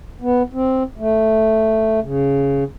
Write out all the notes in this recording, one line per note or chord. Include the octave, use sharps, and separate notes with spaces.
B3
C4
A3
C#3